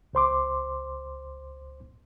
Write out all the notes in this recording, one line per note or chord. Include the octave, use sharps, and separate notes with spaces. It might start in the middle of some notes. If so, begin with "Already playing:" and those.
C#2 C5 C6 D6